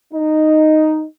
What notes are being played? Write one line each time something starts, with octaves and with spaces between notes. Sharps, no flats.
D#4